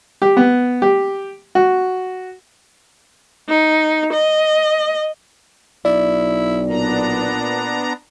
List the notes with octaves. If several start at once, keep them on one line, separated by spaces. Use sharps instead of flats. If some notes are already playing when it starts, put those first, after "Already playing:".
G4
B3
G4
F#4
D#4
D#5
B1 E4 D5
A#2 B3 D4 A#5